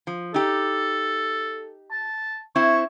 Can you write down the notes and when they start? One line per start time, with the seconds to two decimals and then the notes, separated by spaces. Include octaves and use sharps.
0.07 F3
0.34 D#4 G4 A4
1.91 A5
2.56 C4 E4 C#6